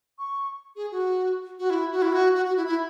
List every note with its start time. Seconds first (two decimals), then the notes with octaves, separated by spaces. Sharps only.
0.18 C#6
0.76 G#4
0.91 F#4
1.59 F#4
1.70 E4
1.92 F#4
2.02 E4
2.12 F#4
2.35 F#4
2.45 F#4
2.56 E4
2.66 E4